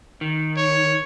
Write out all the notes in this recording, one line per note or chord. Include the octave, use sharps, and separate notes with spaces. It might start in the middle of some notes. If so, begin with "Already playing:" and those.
D#3
C#5